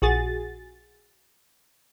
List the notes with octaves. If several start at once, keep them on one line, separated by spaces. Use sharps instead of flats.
A#1 F#4 G#4 A6